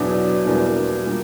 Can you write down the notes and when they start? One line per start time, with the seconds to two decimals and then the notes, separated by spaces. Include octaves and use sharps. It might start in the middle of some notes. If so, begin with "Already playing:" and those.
Already playing: E2 B2 F#3 B3 D4
0.45 E2 B2 G3 A#3 D4
1.04 A#2 G3 A#3 D4